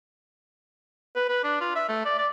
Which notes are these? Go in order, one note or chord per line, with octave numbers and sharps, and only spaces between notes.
B4
B4
D4
F4
E5
A3
D5
D5